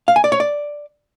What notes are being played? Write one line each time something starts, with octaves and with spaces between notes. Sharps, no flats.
F5
G#5
D5
C#5
D5